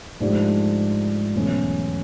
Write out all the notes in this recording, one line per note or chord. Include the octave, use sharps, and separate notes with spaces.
G#2 F3 A3 D4 G4
E2 B2 F#3 A3 C#4